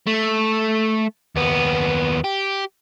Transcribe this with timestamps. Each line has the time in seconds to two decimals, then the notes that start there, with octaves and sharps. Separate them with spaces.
0.07 A3
1.35 D#2 B3
2.24 G4